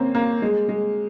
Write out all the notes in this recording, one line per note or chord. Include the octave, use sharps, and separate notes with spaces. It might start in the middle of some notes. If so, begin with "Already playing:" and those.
Already playing: A#3 C4 C#4
A#3
G#3
G#3